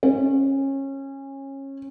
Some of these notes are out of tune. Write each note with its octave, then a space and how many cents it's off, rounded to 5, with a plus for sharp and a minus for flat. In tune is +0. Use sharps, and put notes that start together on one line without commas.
C#4 -25